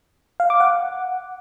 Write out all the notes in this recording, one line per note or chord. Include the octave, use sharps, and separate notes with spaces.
F5
D6
F#5